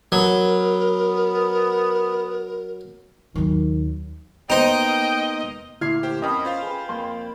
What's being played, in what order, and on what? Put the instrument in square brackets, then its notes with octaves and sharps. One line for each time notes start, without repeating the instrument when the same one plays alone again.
[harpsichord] F#3 [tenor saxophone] B3 [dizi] A#4
[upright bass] D#2 F#3 [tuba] D#3
[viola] A#3 D#5 [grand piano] B3 C5 [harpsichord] D#4 [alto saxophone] G5
[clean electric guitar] D2 A#2 [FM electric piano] E4 [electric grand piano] F6 G#6 C7
[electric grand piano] G4 C5
[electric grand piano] F2 A#4 [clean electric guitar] B3 C#4 D#5 [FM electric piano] G5 B5
[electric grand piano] F4 C5 F5
[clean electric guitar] G#4 B4
F2 A#3 C6